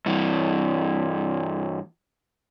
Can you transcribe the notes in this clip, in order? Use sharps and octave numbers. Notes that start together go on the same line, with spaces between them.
G2 E3